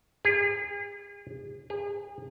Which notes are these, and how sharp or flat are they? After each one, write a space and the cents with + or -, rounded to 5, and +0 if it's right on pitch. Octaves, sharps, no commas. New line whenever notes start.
G#4 -40
G#4 -40